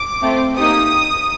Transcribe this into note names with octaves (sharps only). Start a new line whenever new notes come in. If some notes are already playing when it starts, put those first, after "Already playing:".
Already playing: D6
A3 C4 F4
A#3 D#4 G4 D#6